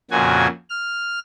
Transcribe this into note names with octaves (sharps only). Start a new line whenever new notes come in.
F2 A#2 C#3 F#4 G#5
F6